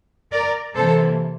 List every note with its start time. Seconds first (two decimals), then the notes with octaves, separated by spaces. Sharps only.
0.31 A#4 D5
0.75 C3 E3 A#3 A4 C5